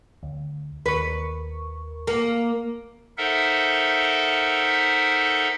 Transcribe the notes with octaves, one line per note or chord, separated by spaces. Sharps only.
D2
D#2 A#4 B4 C#6
A#3
D#4 A4 A#4 C5 E5 F#5